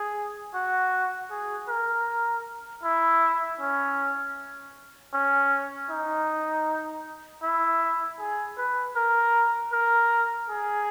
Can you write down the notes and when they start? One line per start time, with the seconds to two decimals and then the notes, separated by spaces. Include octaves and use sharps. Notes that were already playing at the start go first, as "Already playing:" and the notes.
Already playing: G#4
0.54 F#4
1.30 G#4
1.69 A#4
2.83 E4
3.60 C#4
5.14 C#4
5.90 D#4
7.43 E4
8.19 G#4
8.57 B4
8.96 A#4
9.72 A#4
10.49 G#4